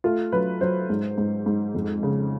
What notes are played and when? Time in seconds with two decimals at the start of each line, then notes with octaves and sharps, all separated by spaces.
0.04 A3 F4
0.32 F#3 B4
0.61 F#3 C5
0.90 G#2
1.18 G#2
1.46 G#2
1.75 F2
2.03 C#3